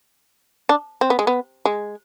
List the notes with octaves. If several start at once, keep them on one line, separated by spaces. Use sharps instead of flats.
D4
C4
B3
G#3
B3
G#3